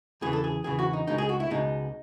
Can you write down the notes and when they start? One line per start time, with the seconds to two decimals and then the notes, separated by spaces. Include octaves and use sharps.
0.21 E2 C#3 E3 G#4
0.33 A4
0.44 G#4
0.64 E2 C#3 E3 G#4
0.79 F#4
0.93 D#4
1.07 C#2 B2 G#3 D#4
1.18 G#4
1.29 F#4
1.40 E4
1.50 C#2 B2 G#3 D#4